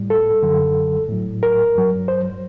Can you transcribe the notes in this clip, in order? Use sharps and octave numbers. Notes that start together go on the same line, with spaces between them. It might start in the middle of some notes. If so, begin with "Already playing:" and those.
Already playing: A2 G3
A4
F#2 D3 F#3
A2 F#3
A#4
G2 F#3
C5